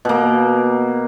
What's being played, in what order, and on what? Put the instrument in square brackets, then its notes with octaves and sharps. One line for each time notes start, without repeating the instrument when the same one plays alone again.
[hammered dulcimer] B2 A#3